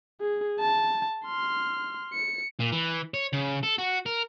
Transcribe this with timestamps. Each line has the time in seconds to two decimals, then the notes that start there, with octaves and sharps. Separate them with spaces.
0.21 G#4
0.60 A5
1.26 C6 F6
2.13 C#7
2.60 A#2
2.72 E3
3.14 C#5
3.33 C#3
3.63 A4
3.78 F#4
4.06 A#4